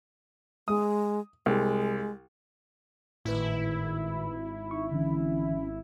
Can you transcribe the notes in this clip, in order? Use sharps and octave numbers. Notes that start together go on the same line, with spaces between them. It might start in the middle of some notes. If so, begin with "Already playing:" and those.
G#3 D#6
C2 G#3
G#1 A2 D#3 E4 B4
D#4 C#6
D3 E3 C#4